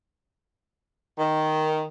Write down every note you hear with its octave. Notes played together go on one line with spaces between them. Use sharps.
D#3